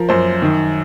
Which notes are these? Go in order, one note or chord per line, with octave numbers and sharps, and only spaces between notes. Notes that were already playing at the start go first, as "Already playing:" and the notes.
Already playing: F3 A#4
F#2 C5
D#3